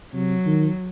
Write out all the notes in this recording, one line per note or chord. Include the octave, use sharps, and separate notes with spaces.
C3 F#3
D#3